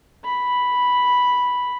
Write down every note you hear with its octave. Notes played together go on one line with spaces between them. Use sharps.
B5